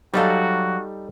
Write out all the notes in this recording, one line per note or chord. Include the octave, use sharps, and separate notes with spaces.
F#3 G3 D#4 F#4 A4 D5 F5